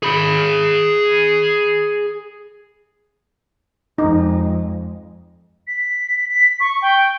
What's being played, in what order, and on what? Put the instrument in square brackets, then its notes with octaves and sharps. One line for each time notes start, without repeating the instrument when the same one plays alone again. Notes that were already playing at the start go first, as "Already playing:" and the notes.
[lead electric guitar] G#4 B5
[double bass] F2 G#3 [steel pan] D#4
[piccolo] B6
B6
C#6
G5